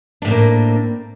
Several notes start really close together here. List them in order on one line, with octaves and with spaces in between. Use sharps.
D4 A2 C4 A#3